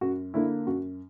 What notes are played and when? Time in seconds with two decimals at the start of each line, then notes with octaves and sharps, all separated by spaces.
0.01 F#2 F#4
0.34 D3 A#3 E4
0.66 F#2 F#4